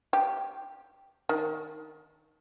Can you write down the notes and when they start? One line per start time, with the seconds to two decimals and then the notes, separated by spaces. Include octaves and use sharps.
0.13 G4
1.29 D#3